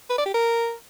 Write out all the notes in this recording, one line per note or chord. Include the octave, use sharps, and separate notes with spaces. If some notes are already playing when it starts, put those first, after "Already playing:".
B4
D5
G4
A#4